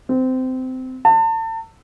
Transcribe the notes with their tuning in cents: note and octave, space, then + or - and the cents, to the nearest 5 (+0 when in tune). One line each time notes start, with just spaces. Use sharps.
C4 -20
A5 +35